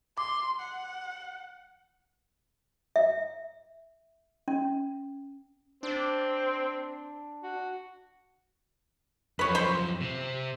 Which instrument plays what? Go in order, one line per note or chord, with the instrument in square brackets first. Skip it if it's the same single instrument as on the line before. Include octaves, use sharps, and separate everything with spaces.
[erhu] C6 [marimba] D6
[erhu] F#5
[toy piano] E5
C#4
[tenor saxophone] C4 [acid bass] D4
[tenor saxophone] F#4
[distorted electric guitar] F#2 F3 [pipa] B4 C#5
[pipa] C5 B5 C6
[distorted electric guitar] C3 C4